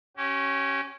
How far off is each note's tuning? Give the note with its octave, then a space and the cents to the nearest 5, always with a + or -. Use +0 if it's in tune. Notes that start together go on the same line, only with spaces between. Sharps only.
C#4 -5 G4 -40